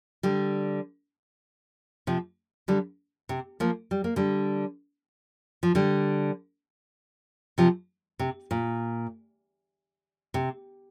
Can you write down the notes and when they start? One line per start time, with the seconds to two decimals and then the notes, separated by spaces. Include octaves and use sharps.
0.23 D3 G3
2.07 C3 F3
2.68 D3 G3
3.29 C3
3.60 F3 A#3
3.91 G3
4.04 A#3
4.16 D3 G3
5.63 F3
5.75 D3 G3
7.58 C3 F3
8.19 C3
8.51 A#2
10.34 C3